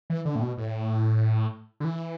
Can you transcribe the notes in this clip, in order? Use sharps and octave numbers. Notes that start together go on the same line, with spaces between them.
E3
D3
A2
B2
A2
D3
E3